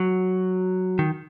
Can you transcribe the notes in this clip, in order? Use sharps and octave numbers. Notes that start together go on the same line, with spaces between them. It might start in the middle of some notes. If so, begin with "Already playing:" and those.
Already playing: F#3
D#3